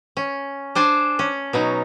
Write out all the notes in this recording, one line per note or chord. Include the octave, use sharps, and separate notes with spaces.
C#4
D4 C5 G#5 A5
C#4
B2 F#3 D#4